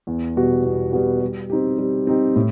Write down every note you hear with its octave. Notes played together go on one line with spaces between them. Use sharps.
E2
B2 G3 B3 F#4
E2
B2 G3 B3 F#4
G3
C4 D#4 G4
G3
C4 D#4 G4
A2